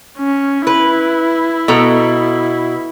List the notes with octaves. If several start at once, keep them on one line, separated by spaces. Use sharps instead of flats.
C#4
E4 B4
B2 A4 A#5